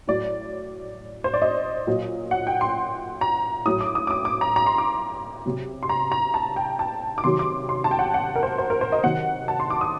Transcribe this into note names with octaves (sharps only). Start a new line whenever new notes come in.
A2 F#3 D5
C5
D5
D#5
A#2 F#3
F#5
G5
C6
A#5
A2 F#3 D#6
D6
D#6
D6
D#6
D6
A#5
A#5
C6
D6
C3 F#3
C6
A#5
A#5
A5
G5
A5
D6
C3 D#3 F#3 C6
D6
C6
A5
G5
F#5
F#5
A#4
C5
C5
A#4
C5
D#5
C3 D#3 F#3 F#5
A5
C6
D6
D#6